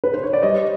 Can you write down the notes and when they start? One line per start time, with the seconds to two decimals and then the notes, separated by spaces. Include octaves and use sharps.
0.04 B4
0.14 C5
0.23 C#5
0.33 D5
0.42 G3 C#5 D#5